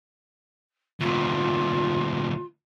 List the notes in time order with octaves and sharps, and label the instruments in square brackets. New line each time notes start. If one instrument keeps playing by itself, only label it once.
[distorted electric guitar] D2 A#2 [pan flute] F4